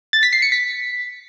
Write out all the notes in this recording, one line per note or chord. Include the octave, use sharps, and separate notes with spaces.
A6
B6
C7
C#7
B6